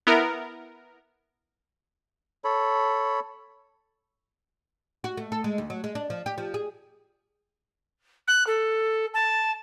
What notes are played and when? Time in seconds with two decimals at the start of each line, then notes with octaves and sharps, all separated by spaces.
0.07 B3 E4 A#4
2.44 A4 C#5 B5
5.04 F#4
5.17 A3
5.32 A4
5.44 G#3
5.58 D2
5.70 F#3
5.84 G#3
5.95 D4
6.10 F3
6.26 G4
6.38 F3
6.54 G#4
8.27 F#6
8.46 A4
9.14 A5